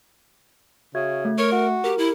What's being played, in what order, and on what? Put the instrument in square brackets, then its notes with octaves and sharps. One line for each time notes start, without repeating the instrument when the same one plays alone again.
[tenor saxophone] C#3 [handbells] F#4 E5 G#6
[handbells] A3
[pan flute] A#4 [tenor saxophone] C#5
[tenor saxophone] F#4
[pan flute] G4 [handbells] A#4
[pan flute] E4 [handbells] G4